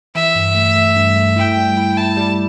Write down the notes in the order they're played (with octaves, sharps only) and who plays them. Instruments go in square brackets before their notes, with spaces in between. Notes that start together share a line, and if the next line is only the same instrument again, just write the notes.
[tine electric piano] E3 [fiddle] E5
[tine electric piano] G2
A3
A3
G2
A3
[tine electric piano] E4 [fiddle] G5
[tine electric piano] G3
E4
[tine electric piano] E4 [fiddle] A5
[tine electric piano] G3